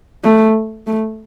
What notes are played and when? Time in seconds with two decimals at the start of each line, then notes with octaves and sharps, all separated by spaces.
0.24 A3
0.87 A3